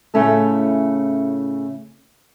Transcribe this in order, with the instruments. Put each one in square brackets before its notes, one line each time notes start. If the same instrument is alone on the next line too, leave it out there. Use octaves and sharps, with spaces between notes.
[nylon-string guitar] A2 C#3 A3 C#4 E4 A4